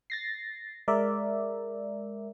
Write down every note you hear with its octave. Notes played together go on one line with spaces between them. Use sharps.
A6 A#6 C7
G#3 A#4 D5 E5